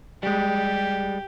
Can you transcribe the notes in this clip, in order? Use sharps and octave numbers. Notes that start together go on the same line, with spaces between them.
G3 G#3 G4